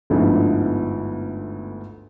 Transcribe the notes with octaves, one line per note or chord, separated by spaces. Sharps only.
G1 D2 G#2 F3 B3 E4